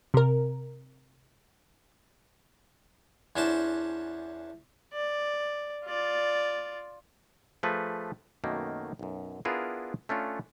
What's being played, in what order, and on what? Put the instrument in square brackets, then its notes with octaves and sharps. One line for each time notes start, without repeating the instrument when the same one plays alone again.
[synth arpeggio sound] C3 A#4
[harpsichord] E2 C#4 D4 C5 A5
[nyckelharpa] D5
F4 D5
[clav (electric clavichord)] F3 A3 G#4 B4
F#2 B2 D#3 A3 A#3
B1 F#2
B3 D4 E4 F4 G#4 A#4
A3 C#4 D4 F4